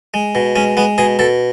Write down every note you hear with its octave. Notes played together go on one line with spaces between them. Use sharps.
G#3
B2
G#3 C#4
G#3 B3
B2 G#4
B2 A4